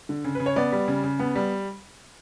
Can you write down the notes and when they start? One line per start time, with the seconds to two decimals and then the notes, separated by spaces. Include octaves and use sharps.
0.09 D3
0.24 C#3
0.35 B4
0.40 C#3
0.46 C#5
0.56 B3 D5
0.72 G3
0.88 C#3
1.04 C#3
1.19 B3
1.35 G3